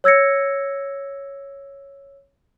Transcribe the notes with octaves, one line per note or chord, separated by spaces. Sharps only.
C#5 E6 G#6 A#6 C#7